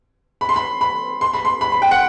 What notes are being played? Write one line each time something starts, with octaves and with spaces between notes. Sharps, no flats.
B5
C6
B5
B5
C6
B5
C6
B5
B5
G5
F#5